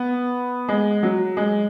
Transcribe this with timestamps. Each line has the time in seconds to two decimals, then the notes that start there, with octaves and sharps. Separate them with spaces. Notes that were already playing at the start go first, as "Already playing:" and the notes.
Already playing: B3
0.68 G#3
1.03 F#3
1.37 G#3